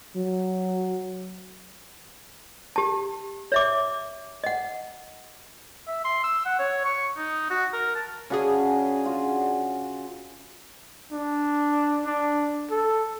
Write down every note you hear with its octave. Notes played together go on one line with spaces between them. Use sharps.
F#3
G4 A5
C#5 E5 D6
D#5 F#5
E5
C6
E6
F#5
C#5
C#6
D#4
F#4
A#4
A5
C#3 C#4 D4 F#4 G#4
F4 F#4
D4
D4
A4